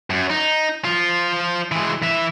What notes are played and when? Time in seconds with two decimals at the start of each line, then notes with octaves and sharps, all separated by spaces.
0.10 F#2
0.30 D#4
0.85 F3 F4
1.72 E3 G#3
2.02 E3 E5